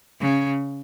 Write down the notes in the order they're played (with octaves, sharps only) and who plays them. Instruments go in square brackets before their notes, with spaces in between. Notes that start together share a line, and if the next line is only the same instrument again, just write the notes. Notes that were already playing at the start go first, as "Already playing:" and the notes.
[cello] C#3